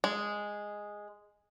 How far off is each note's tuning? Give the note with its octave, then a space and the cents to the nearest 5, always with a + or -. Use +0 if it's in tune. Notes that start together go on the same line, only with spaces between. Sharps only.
G#3 -5